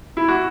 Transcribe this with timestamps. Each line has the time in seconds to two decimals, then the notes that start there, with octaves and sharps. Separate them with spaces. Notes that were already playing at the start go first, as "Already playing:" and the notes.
0.17 E4
0.28 F#4